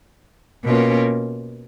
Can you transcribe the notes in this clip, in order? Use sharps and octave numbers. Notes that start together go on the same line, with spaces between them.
B2 A#3 C#4 F4